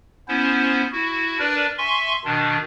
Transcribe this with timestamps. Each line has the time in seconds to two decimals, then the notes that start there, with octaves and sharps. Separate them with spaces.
0.28 B3 C#4 E4 C5
0.92 E4 F#4
1.39 D4 A#4 B4 D5
1.78 E5 G#5 C6 C#6
2.25 B2 D#3 D4